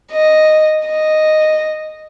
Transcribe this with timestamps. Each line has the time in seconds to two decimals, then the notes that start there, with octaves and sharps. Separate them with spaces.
0.12 D#5
0.87 D#5